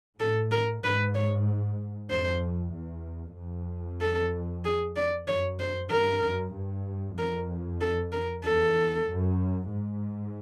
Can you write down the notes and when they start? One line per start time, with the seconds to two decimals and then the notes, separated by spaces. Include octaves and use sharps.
0.20 A2 A4
0.51 A#4
0.83 G#2 B4
1.15 C#5
2.10 F2 C5
2.74 E2
3.37 F2
4.01 A4
4.65 G#4
4.96 D5
5.27 F#2 C#5
5.60 C5
5.90 G2 A#4
6.23 F#2
6.54 G2
7.17 F2 A#4
7.81 A4
8.12 A#4
8.44 E2 A4
9.08 F#2
9.71 G#2